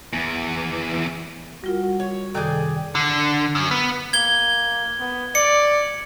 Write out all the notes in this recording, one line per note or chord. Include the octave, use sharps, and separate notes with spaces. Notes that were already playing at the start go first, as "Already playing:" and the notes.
E2 E3
G3 F4 F#4 A#4
C#5
F#2 C3 D#3 G#4 A4 D5 G5
D3
F#2
B3
A#3 G#6 G7
B3
D5 C#7